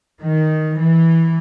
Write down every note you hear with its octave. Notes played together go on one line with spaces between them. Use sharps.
D#3
E3